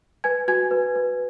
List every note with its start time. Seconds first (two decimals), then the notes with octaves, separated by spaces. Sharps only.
0.24 B4 G#5 G#6
0.48 F#4 G#5 G#6
0.71 B4
0.95 B4